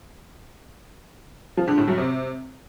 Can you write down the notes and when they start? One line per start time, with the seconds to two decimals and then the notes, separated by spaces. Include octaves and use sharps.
1.57 F3
1.67 D3
1.78 A2
1.88 F#2
1.98 C3